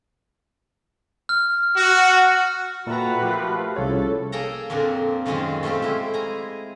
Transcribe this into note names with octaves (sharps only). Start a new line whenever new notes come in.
F6
F#4
A#2 F#4 A4 B4 E5 G5 A#5
F3 A3 F4 G4 A#4
C2 C#4 G#4 A4 C#5
A#3 G#4 A4 G5 A#5
F2 A#2 C4 D4 A#4
F#2 A#2 D#3 G#3 C4 F4
F2 A3 F4 G4 C5
G#3 E4 F4
G#4 G#5 A#5